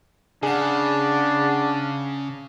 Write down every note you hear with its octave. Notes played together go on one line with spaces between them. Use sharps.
C#3 D4 G#4 F#5